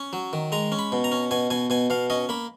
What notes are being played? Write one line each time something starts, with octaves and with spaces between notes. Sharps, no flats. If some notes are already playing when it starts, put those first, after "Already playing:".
Already playing: C#4
F#3
D#3
G#3 A#5
C#4
B5
B2
A#5
C#4
B2 G#5
B2 G#5
B2 G#5
B2 F5
C#4 D#5
A#3 B5